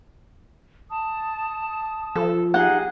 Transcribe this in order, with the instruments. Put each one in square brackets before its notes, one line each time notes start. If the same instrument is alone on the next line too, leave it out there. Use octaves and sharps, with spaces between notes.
[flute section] A5 D#6
[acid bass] F3 [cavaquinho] A4
[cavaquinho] D#4 F#5 [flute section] G4 G#4 F5